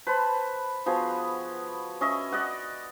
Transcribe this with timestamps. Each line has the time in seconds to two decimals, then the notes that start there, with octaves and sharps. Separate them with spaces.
0.07 B4 C5 A5 B5
0.86 F3 B3 F#4 G#4
2.01 C#4 D#5 E5 C#6
2.31 D5 D#5 F#5 D6